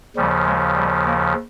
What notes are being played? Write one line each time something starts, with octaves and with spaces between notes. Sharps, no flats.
D#2 C#3 F3 G3
G#3
G3
A#3